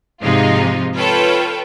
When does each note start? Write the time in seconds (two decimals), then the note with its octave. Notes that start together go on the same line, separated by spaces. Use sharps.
0.21 G#2 C3 F3 G#3 D#4 F4
0.96 F4 A4 B4 C#5 G5